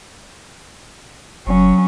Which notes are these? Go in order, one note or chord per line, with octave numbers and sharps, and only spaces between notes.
F#1 F#3 C#4